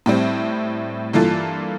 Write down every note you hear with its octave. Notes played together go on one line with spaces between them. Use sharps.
A2 G3 C4
G2 E3 A#3 F4 A4